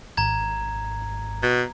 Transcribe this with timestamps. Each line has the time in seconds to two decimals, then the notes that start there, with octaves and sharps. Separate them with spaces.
0.17 G#1 A#5 G#6
1.43 B2